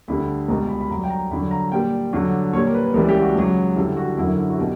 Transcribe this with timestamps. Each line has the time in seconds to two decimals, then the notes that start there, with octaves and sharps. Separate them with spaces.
0.08 D2 D3 G3 B5
0.48 C#2 B2 G3 A#5
0.69 B5
0.81 B5
0.89 G2 F#3 A#5
1.04 G5
1.10 A#5
1.31 G2 D3 F#3 B5
1.51 A#5
1.72 A#2 G3 G5
2.13 G2 D3 F#3
2.53 A#2 C#5
2.57 G3
2.67 A#4
2.74 B4
2.85 B4
2.94 C#2 C#3 E3 G3 A#4
3.09 G4
3.21 F#4
3.36 C#2 C#3 F#3
3.76 G2 D3 G3 E4
3.97 F#4
4.17 F#2 D3 F#3 E4
4.37 E4
4.50 F#4
4.58 B2 G4